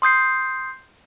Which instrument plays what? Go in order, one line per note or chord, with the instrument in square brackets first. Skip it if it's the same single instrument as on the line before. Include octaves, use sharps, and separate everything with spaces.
[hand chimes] C6 D#6 G6 C7